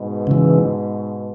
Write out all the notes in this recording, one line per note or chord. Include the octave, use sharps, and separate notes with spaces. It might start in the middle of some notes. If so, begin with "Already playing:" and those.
Already playing: G#2 B2
C#3 E3